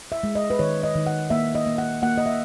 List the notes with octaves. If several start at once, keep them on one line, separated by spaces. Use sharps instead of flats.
E5
G#3
D#5
B4
D#3 C#5
D#5
D#3
F#5
A#3 E5
D#5
A#3
F#5
A#3 F#5
D#5
E5